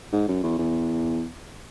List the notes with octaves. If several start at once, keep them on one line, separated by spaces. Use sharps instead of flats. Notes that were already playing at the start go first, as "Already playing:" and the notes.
G#2
F#2
E2
E2